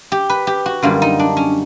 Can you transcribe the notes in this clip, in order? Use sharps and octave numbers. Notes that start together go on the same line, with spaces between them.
G4
B4
G4
F#4
F#2 D3 G3 A#3 F4
D#4
D4
C#4